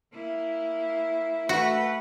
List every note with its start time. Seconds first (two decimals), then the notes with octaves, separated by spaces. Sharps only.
0.13 A#3 E4
1.49 A3 F#4 B4